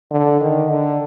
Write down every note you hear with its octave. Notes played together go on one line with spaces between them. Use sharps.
D3
D#3
D3